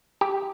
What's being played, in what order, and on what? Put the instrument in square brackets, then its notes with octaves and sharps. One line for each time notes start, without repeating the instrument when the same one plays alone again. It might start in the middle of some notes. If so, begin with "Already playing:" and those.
[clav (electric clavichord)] G4